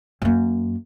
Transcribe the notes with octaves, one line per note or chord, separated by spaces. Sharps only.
F#2 A#3